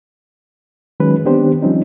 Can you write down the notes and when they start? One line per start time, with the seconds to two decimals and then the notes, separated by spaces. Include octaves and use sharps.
1.00 D#3 F#3 G#3 C#4 B4
1.25 D#3 B3 C4 D4 G4 C5
1.62 F3 G3 C4 C#4 D#4